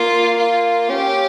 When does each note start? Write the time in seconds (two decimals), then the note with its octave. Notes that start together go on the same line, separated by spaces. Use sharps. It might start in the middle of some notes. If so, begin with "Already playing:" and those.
Already playing: A#3 F4
0.37 F4
0.89 C#4 G4